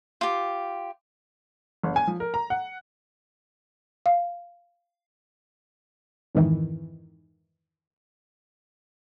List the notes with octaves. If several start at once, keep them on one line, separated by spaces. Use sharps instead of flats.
F4 G4
F#1
G#5
F3
A#4
A#5
F#5
F5
F2 G#2 D#3 E3